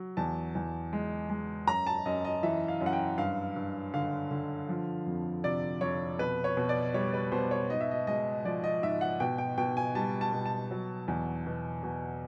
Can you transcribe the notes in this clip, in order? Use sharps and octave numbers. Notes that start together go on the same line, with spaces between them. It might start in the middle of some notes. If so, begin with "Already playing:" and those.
Already playing: F#3
E2 A5
E2
G#3
G#3
F#2 A#5
A5
F#2 D#5
D#5
E3 E5
F5
F#2
F#5
G5
G2 F5
G2
D3 F5
D3
F3
F2
C3 D5
F2 C#5
B2 B4
C#5
B2
D5
G3 C#5
B4
B2 C5
C#5
G#2 D#5
E5
D#5
G#3 D#5
F3 D5
D#5
G#2 E5
F#5
B2 G5
G5
B2 G5
G#5
G3 A5
A5
B2
A5
F#3
E2
B2
B2